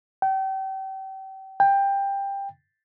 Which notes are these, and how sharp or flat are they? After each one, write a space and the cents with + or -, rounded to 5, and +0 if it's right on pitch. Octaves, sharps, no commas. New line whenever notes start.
G5 -35
G5 +15